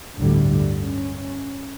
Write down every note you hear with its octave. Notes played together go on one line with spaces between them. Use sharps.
G1 D2 A2 D3 G3
C#4